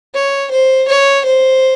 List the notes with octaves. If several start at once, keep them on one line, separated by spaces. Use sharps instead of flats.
C#5
C5
C#5
C5